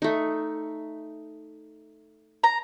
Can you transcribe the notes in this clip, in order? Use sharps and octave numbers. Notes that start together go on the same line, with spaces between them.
A3 D#4
A#5